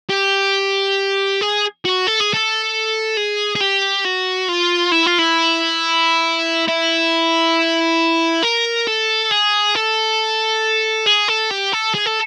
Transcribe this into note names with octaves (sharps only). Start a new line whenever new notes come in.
G4
G#4
F#4
A4
G#4
A4
G#4
G#4
G4
F#4
F4
E4
F4
E4
E4
A#4
A4
G#4
A4
G#4
A4
G4
A4
G#4
A4